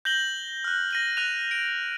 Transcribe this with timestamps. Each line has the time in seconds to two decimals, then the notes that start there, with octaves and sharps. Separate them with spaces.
0.05 G6 A#6 F#7 G7
0.64 F6 F#6
0.91 A#6 D#7 F#7
1.17 F#6 D#7 F7
1.51 D7